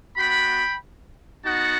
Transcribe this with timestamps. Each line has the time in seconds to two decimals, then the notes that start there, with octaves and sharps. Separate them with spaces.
0.17 B3 F#4 G5 B5
1.44 B3 D#4 F#4 F#5 A5